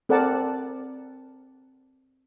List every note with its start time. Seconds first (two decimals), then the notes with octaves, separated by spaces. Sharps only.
0.09 C4 A4 A#4 D5 F#5 A5